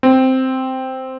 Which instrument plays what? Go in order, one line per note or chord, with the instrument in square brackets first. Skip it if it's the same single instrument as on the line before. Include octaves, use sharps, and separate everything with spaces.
[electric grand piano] C4